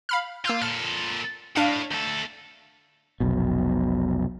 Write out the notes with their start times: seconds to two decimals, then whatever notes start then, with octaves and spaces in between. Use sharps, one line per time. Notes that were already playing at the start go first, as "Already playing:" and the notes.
0.09 F5 B5 F6
0.45 A#3 F4 E6 G6
0.62 A#2 A4 F6
1.56 A2 D4 F5
1.91 D2 A4
3.20 F1 B1 B2